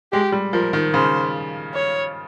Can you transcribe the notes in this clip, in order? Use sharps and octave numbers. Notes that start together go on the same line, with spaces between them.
G#3 G4
G3
F3 A#4
D#3
C#3 C5
C#5